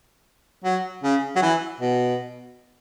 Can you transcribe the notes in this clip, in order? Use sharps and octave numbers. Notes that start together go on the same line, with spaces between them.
F#3
C#3
F#3
E3
B2